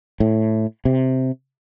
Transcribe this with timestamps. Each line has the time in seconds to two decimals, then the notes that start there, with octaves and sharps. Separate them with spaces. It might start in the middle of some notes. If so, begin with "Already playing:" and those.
0.20 A2
0.85 C3